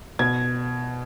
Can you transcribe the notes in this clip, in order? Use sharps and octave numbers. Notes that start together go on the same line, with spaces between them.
B2 G#6